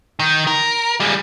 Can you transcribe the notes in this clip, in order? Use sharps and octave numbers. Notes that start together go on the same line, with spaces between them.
D#3
A#4
G3 G#3